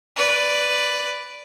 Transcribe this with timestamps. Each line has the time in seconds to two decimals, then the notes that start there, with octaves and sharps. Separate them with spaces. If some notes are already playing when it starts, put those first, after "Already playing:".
0.16 B4 D5